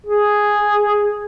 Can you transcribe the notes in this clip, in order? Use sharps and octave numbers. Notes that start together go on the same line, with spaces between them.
G#4